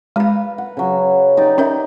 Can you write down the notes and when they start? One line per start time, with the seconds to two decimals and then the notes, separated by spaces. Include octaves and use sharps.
0.16 G#3 B4 F5 A#5
0.58 F#5
0.77 C#3 F#3
1.37 D#4 G4 D5
1.58 C#4 A#4 E5